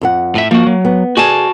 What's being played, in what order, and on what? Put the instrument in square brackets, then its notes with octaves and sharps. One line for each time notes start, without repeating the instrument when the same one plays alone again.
[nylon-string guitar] F2 A4 F#5
[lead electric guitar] A2 E5
[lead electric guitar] F3 F#4 [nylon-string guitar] A#3
[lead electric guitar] F#3
[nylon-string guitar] B3
[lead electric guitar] F#4 A5 [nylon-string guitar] G#4 D5 G#5